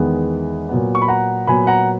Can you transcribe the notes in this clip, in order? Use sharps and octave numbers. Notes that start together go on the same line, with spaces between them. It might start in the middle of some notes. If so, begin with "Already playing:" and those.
Already playing: E2 D#3 G#3 B3
A#2 F#3 B3
C#6
B5
F#5 A#5
A#2 F#3 B3 G#5 B5
F#5 A#5